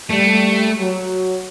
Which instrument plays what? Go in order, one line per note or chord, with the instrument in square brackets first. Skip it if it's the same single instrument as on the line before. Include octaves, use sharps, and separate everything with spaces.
[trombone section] G3 [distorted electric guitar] A3
[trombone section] F#3